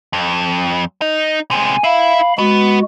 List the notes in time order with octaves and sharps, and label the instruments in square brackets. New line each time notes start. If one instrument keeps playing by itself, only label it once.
[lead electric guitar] F2
D#4
[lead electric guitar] C3 G#3 [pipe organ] G#5
[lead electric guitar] E4 [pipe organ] F5 B5
[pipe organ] G#3 F#4 [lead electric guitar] B3